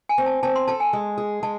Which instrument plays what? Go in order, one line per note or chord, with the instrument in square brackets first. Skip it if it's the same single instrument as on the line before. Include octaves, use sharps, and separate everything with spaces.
[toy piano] G#5
[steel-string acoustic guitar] C4
[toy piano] A5
[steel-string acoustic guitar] C4 [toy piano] A5
[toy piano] C6
[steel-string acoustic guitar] A4 [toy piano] A5
[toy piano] G#5
[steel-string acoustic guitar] G#3
G#4
[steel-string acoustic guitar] G#3 [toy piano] A5